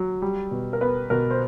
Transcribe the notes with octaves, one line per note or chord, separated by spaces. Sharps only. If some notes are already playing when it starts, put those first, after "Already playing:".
Already playing: F#3
G3
B2
A#4
B3 B4
B2 A#4
C5